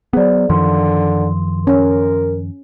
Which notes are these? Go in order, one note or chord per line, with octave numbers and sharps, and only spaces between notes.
F#3 B3 G#4 C5 D5
F#2 D3 D#3 F3 C6
C#4 A#4